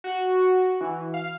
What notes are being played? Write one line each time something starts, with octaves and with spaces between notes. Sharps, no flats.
F#4
E3
F5